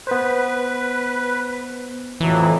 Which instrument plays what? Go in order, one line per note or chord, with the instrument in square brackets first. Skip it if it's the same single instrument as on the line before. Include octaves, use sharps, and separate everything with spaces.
[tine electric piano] B3 C5 [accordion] B4
[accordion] F2 A2 F#3 [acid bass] E3